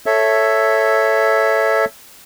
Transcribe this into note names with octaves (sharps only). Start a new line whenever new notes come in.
A4 C#5 E5